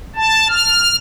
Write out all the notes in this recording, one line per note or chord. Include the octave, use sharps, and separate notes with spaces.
A5
F6